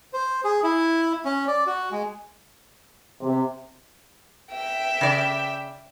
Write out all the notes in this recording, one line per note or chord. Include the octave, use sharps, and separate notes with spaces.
C5
G#4
E4
C#4
D5
F#4
G#3
C3
E5 G5
C#3 D5